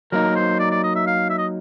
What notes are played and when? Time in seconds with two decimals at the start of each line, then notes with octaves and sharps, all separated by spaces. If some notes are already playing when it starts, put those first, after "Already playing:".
0.12 F#3 A#3 D#4 A#4
0.36 C5
0.59 D5
0.71 D5
0.84 D#5
0.95 E5
1.07 F5
1.30 E5
1.38 D#5